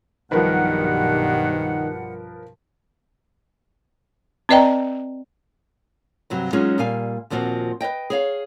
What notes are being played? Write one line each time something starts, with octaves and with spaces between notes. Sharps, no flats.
B1 G2 D#3 F3 G3 A#4 B4 F#5
C4 B4 D5 D#5 G5 A#5
G2 C3 F#3
F#3 G#3 C#4 D#4 F4 G#4
A#2 G3 F5 G#5
D#2 A#2 F3 C4 F#4
B4 C#5 D#5 G5
G#4 C#5 F5